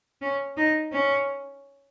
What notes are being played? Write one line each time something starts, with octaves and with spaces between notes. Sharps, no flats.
C#4
D#4
C#4